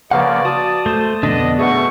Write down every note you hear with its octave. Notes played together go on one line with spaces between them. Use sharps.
C#3 F3 A#3 B4 D5 F5 F#5
F#4 A5 D#6
A3 C5
F2 B2 D3 B3 D4 D#5
B2 A3 G#4 B4 F#5 C#6